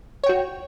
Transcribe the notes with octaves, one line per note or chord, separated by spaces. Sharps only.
F#4 C#5 G5